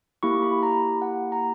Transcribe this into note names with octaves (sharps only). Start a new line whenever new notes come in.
A#3 E4 G4 C#6
B5
A#5
F#5
A#5